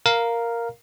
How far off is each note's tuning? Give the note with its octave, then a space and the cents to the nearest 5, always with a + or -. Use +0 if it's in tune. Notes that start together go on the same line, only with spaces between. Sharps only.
A#4 +0 F5 +0 A#5 +0